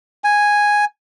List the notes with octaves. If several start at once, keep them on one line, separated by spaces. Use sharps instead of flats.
G#5